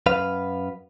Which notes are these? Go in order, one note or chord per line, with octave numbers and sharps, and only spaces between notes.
F#2 B4 F5